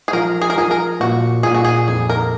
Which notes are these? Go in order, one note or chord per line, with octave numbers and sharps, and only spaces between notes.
G#4
F3 A#4
G#4
A#4
F3 G#4
A#4
A#2 F#4
A#2 G#4
F#4
G#4
F2 G#4
A#4